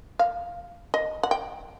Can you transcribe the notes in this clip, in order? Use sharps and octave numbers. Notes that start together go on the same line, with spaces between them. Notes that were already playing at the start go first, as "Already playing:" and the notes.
F5
D#5
F#5
G5